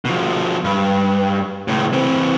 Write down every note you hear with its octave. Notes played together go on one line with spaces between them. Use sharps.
B2 F3
G2
C#2 A2
E3 C4